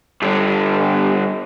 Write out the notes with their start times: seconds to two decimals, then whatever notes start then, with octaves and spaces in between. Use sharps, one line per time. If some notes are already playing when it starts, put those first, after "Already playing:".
0.22 G2 D3